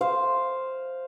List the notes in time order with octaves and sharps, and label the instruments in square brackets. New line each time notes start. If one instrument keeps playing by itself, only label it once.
[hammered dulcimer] C5 F5